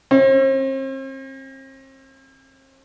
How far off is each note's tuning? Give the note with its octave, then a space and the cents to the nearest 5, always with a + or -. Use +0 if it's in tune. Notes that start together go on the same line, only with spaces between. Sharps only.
C4 +40